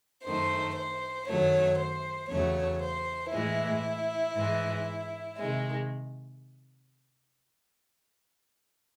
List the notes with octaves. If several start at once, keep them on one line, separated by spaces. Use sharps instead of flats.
F#2 D#3 A3 C5
C5
F#2 D#3 F#3 A3 C#5
C5
E2 C#3 F#3 A3 C#5
C5
A2 E3 G#3 E4
G#2 E3 G#3
C3 D#3 G#3